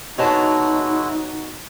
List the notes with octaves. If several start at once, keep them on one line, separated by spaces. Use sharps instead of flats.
B2 G#3 D#4 E4 F#4 C#5 D#5 A5